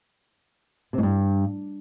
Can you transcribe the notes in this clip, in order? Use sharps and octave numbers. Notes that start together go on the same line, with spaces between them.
C3
G#2
G2